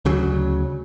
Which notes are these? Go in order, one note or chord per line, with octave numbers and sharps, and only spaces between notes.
D2 C#3 F#3